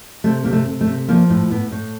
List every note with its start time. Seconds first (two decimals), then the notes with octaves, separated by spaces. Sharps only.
0.24 C3 A3
0.44 C3 A#3
0.52 A3
0.67 C3
0.81 A3
0.87 C3
1.08 F3 A#3
1.30 A2
1.50 A2 B3
1.71 A2